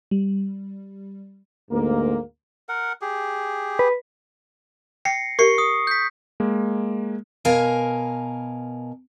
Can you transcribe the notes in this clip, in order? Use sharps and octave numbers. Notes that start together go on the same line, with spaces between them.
G3
D2 G#2 A#3
A#4 F#5
G4 G#4
B4
G5 A#6 C7 C#7
G4 A#4 C#6 C7 C#7
D#6
G6 B6
G#3 A#3
B2 A#4 F5 G#5